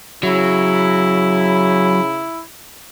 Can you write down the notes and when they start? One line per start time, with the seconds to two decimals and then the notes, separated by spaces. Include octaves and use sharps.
0.23 C#3 F#3 E4